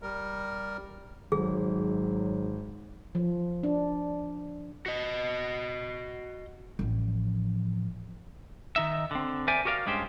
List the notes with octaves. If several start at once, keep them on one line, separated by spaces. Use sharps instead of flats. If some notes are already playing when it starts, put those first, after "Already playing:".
G3 A#4
G#1 G#2 F#3 G#4
F3
D4
F#4 D#5
A1 F3
D#3 D#4 E5
D3 C4
A#4 C5 D5 E5 G#5
F#4 G4 A#4 D5 F5
G2 G#3 C#4 G4 C5